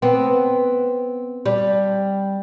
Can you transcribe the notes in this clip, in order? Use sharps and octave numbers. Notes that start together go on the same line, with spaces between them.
B3 C4
G3